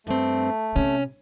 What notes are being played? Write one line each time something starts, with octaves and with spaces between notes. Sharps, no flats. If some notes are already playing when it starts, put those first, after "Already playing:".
G2 A3 C4
C3 C#4